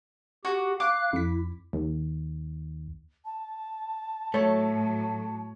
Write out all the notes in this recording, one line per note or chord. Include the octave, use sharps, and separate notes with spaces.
F#4 G4
F5 D6 F#6
F2 E4 B6
D#2
A5
A2 F#3 A3 C#5